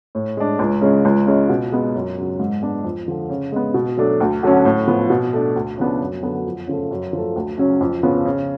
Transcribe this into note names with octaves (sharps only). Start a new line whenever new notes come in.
A2
G#3 D4
C#2
C#3 G#3 C#4
C#2
C#3 G#3
B2
G#3 B3
F#2
C#3 F#3
G#2
G#3 B3 D4
F2
D3 F3
C#3
G#3 B3
B2
F#3 A3 D4
D2
D3 F#3 A3 C#4
A2
F3 B3
B2
A3 D4
D2
C#3 F3 B3 D4
F#2
D3 F#3 B3
F2
C#3 F3 A3
F#2
F3 A3
D2
C#3 F#3 C#4
F2
C#3 F3 B3
C#3